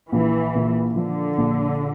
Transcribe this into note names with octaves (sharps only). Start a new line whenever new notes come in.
A#1 E3
A#2
D3 F3
A#1